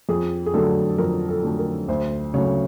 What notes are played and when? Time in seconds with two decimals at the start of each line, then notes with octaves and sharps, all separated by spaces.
0.09 F2 G#4
0.46 G#4
0.54 D3 F#3 A3 A4
0.98 F2 A#4
1.28 A4
1.43 D3 F#3 A3
1.59 A#4
1.88 D2 C5
2.34 C#3 F#3 A3 C#5